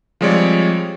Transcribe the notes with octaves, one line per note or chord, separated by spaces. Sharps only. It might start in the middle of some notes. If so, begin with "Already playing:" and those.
F3 G3 G#3 C4 C#5 D5